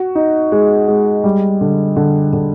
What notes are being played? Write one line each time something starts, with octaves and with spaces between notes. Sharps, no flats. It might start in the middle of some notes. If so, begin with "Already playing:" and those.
Already playing: F#4
D#4
G#3
G#3
G3
D3
D3
D3